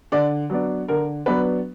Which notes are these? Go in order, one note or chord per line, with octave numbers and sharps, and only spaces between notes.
D3 D5
F#3 B3 D4
D3 A#4
F#3 B3 D4 B4